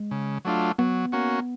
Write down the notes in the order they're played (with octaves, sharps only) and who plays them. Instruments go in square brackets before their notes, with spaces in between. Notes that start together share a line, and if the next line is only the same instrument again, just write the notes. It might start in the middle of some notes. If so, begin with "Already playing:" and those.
Already playing: [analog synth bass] G#3
[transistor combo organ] C#3
F#3 A3 D4 F4
[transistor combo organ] F#3 [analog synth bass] B3
[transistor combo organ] A#3 C#4 F#4